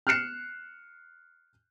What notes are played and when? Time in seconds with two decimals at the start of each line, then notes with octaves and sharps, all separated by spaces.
0.07 F6 F#6 C7 C#7 E7